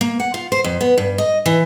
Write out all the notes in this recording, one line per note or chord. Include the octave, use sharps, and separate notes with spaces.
A#3
F#5
F4
C5
F2
B3
G2
D#5
E3